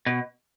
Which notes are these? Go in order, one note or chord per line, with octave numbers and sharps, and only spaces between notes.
B2